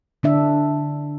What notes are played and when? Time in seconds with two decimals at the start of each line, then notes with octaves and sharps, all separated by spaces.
0.23 D3 D4 E5